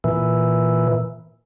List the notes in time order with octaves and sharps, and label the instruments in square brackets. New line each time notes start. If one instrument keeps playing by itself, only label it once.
[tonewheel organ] A#2 E3